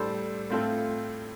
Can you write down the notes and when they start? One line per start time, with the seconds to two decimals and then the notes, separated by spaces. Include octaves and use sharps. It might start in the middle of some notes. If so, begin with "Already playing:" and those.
Already playing: A2 G3 D4 A4 C5
0.50 A2 A3 C4 F4 A4